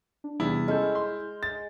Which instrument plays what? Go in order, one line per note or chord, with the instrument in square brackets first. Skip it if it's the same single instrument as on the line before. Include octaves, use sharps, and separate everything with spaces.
[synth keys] D4
[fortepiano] E2 [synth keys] C3 G3 [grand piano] E4
[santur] G#3 [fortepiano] C#4 A4 [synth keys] F6 G6
[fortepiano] C6
[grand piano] A6